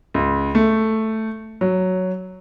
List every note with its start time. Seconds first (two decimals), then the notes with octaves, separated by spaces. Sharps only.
0.14 C#2
0.55 A3
1.61 F#3